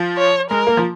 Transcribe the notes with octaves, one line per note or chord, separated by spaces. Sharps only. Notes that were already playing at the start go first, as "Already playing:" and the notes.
Already playing: F3
C#5
G#3 A#4
A#3
F3